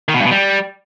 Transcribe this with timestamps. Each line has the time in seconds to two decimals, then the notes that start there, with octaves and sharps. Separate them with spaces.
0.09 D#3
0.14 B2
0.20 G2
0.25 B2
0.31 G3